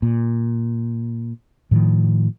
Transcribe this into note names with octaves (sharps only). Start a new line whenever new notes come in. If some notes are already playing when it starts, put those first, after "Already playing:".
A#2
A2 D#3 F3